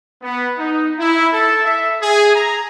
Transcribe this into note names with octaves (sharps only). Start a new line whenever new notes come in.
B3
D#4
E4
A4
E5
G#4
A#5